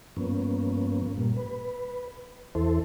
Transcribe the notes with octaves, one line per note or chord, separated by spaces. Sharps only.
G2 F3 A#3 B3 C#4
A#2 G3 A#3
B4
E2 E3 E4 A4 C5